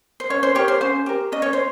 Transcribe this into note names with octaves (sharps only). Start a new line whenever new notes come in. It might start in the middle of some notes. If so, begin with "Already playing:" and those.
C5
C#4 C#5
C5
G4 A#4 C#5
C5
C#4 C5
G4 A#4
C#4 D#5
C#5
C5